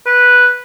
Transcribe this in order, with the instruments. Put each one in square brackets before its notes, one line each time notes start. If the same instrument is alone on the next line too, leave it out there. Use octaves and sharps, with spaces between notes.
[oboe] B4